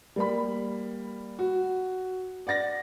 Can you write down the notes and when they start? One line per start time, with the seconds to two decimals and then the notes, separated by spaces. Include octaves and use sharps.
0.16 G3 A#3 B5
1.39 F#4
2.47 D5 F#5 A6 A#6